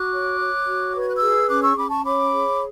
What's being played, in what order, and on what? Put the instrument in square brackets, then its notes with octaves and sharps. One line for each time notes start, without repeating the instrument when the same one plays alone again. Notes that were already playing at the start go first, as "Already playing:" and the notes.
Already playing: [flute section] F#4 D6 F#6
C#5
C#5
F#4
B4
G#6
F#6
E6 G#6
G#4
C#4 D6 F#6
C#6 E6
C#4 B5 D6
A5 C#6
C#5 B5 D6
G#4